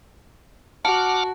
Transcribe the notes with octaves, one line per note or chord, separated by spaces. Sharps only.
F#4 F#5 A5 D6 F6